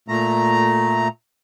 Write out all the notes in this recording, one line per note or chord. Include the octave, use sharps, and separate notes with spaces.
A#2 A3 A#5